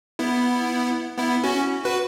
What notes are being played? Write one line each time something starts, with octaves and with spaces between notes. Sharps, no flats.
B3 E4
B3 E4
C#4 F#4
F#4 B4